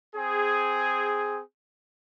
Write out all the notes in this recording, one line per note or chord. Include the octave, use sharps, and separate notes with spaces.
C4 G#4